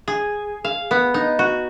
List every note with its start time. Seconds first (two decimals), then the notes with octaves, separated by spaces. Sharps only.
0.08 G#4
0.64 F5
0.91 B3
1.14 D#4
1.39 F#4